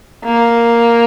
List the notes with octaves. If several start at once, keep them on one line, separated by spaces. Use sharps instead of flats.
A#3